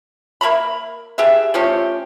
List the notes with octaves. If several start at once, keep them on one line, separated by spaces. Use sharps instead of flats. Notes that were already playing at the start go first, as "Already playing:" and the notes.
A#3 E5 A#5 B5
D4 G4 G#4 E5
F3 A3 C#4 G4